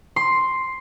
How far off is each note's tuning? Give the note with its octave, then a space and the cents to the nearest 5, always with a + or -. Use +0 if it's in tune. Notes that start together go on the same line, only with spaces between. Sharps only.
C6 +5